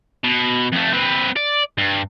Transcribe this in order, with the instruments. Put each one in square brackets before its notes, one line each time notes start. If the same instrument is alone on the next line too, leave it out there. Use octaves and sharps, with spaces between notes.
[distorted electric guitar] B2
F2 A3
C4 B4
D5
G2